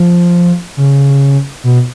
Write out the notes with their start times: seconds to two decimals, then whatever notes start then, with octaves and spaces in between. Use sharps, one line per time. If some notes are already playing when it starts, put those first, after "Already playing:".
Already playing: F3
0.77 C#3
1.64 B2